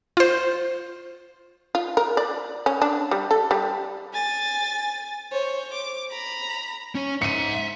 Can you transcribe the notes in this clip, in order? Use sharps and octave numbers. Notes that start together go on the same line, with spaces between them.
F4 C5
F4
A#4
D5
C#4
D4
G3
A4
G3
G#5 A6
C5 C#5
D6
A#5 B5
C#4 C#5
G#2 E5 C#7 D#7